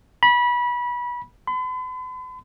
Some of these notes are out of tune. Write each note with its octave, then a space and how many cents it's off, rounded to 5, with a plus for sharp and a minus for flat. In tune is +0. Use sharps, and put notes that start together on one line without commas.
B5 -25
B5 +45